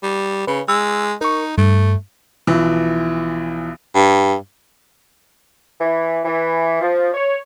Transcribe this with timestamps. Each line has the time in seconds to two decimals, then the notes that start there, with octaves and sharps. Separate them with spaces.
0.03 G3
0.47 C#3 B4
0.68 G#3 E6
1.21 D#4 A#4 C#6
1.58 G2 A3
2.47 B1 E3 F3
3.95 G2
5.81 E3
6.25 E3
6.81 F3
7.14 C#5